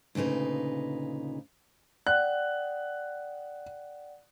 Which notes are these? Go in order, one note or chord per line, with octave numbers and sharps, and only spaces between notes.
D2 A#2 C#3 D#4 B4
D5 F#5 G5 F#6